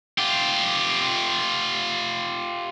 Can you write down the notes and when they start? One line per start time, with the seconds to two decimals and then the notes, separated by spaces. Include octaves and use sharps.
0.18 F4 G4